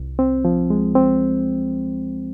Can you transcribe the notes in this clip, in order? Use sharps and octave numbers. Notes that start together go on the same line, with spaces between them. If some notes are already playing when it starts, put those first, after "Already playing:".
Already playing: C2
C4
F3
G#3
C4